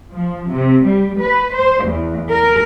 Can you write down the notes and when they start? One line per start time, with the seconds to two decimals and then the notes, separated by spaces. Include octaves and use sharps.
0.11 F3
0.51 C3
0.86 G3
1.19 B4
1.54 C5
1.84 E2
2.28 A#4